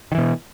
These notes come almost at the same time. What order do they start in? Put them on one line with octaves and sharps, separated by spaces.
D#3 E3 B2